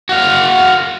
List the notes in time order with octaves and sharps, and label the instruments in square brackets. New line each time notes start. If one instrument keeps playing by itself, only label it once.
[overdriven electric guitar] F#4 F5